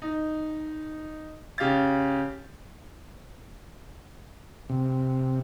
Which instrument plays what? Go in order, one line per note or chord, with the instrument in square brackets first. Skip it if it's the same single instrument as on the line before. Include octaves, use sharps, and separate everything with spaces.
[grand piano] D#4
C#3 G4 F5 A6
[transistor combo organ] C3